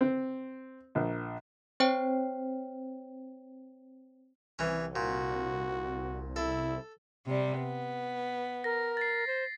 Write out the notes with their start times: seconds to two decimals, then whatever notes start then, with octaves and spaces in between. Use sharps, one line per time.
0.01 C4
0.95 A#1
1.80 C4 C5 C#5 G5
4.59 C2 E3 C#4
4.96 A#2 F#4
6.36 E4 A4
7.26 C3 G3
7.58 B3
8.64 A#4 A#6
8.97 A6 C7
9.27 C5